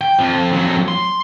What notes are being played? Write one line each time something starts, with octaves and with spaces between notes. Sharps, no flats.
G5
F2 F3
F2 F#3
C6